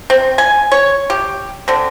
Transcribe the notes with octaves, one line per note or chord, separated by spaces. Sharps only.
C4
G#5
C#5
G4
D3 C4